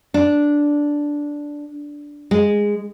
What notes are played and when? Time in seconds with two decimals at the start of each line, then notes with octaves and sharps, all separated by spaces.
0.14 D4
2.31 G#3